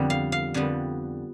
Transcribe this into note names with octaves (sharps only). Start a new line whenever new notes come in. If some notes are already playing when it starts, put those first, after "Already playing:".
Already playing: F2 D3 G3 B3
F5
F5
F2 D3 G3 B3